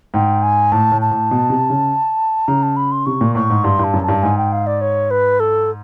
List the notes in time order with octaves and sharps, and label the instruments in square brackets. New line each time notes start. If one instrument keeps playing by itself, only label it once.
[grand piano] G#2 [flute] G5
[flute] G#5
[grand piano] A2 [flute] A5
[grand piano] A2
[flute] A5
[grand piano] A2
B2
C3
C#3
[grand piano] C#3 [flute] A#5
[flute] A5
B5
C6
[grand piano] C3 [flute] C#6
[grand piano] A#2
[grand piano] A2 [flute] C#6
[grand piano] G#2
[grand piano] G2 [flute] C6
[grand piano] G2 [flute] A5
[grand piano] F#2
[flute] A5
[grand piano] G2
[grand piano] G#2 [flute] G#5
[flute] G5
F5
D5
C#5
B4
A4